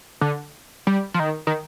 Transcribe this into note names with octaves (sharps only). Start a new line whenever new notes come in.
D3
G3
F3
D#3
D#3